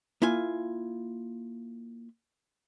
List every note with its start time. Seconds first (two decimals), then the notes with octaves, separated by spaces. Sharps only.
0.22 A#3 E4 F4 G#5